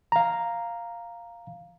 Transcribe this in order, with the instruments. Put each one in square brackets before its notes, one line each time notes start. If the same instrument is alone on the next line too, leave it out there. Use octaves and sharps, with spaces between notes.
[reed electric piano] F5 A#5